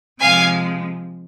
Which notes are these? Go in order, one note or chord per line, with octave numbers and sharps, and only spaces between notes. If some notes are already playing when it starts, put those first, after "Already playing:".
C3 F3 G#3 F5 G#5